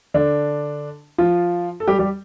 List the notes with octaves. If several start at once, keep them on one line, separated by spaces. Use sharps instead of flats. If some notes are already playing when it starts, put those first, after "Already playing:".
D3 D4
F3 F4
A4
G3 G4
G3 G4